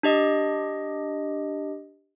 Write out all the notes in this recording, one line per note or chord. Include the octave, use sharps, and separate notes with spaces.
D4 G4 D#5